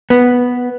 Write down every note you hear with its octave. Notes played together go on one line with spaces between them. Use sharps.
B3